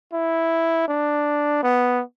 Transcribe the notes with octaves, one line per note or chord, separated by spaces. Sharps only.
E4
D4
B3